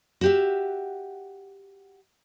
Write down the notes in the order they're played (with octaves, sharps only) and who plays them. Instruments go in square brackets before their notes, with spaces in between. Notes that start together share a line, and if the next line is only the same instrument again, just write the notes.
[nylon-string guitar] F#4 G4 E5